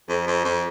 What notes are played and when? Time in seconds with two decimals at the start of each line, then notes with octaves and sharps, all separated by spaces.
0.09 F2
0.27 F2
0.45 F2